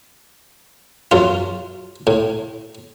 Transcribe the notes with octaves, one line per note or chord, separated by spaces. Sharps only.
F#2 F4
A2